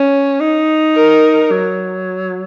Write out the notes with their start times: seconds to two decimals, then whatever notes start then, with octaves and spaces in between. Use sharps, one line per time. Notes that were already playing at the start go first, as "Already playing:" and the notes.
Already playing: C#4
0.40 D#4
0.96 A#4
1.51 F#3